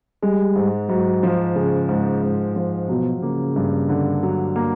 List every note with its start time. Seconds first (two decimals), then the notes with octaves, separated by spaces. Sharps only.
0.22 G3 G#3
0.56 G#2
0.89 G#2 F#3
1.23 F3
1.56 C#3 G#3
1.89 G#2
2.22 G#2
2.56 F3
2.89 B2 F#3
3.22 C#3 A#3
3.56 G2
3.89 D3
4.23 F#3
4.56 A#3